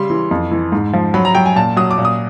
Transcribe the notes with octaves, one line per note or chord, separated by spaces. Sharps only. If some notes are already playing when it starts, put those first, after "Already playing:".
Already playing: C#3 G3 C6
E3
F2
E3
G#2
F3
F#3 B5
A#5
F#3 G5
G#5
A#2 A5
F#3 D#6
D6
A#2
D#6